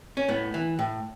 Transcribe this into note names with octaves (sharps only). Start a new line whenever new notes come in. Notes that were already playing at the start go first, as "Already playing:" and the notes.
C#4
A2 B3
E3
A2